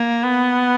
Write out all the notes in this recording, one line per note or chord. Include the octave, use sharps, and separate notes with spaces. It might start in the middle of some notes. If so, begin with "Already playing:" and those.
Already playing: A#3
B3